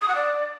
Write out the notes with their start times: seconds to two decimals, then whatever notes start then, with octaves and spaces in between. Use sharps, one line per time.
0.02 D#6
0.08 F#5
0.15 D5